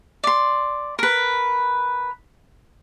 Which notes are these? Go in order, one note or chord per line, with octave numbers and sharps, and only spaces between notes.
D5 C6
A#4 B4